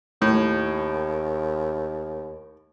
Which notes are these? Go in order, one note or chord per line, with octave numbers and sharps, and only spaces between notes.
D#2 A2